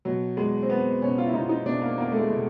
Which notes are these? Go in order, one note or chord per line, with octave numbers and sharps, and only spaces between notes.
B2 F#3
E2 G#3
C4
E2 B3
B2 C#4
F4
E4
B2 D#4
D#4
B2 D4
A#3
E2 A#3
A3
G#3
B2